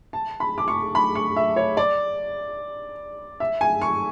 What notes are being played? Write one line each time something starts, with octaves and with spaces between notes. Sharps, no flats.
A5
B5
D6
C#6
B5
C#6
E5
C#5
D5
E5
G#5
C#6